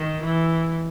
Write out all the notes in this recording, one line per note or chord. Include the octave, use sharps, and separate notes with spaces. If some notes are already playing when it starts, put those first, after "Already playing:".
Already playing: D#3
E3